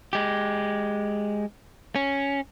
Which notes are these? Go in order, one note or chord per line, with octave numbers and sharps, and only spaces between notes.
G#3 G4
C#4